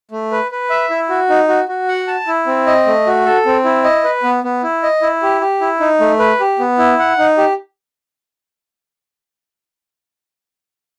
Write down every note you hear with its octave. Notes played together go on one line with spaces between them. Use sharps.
A3
B4
B4
E5
E4
F#4
D#4
F#4
F#4
F#5
A5
E4
C4
D#5
A3
F#4
A4
C4
E4
D#5
B4
B3
B3
E4
D#5
E4
G4
G4
E4
D#4
A3
B4
G4
B3
E4
F#5
D#4
G4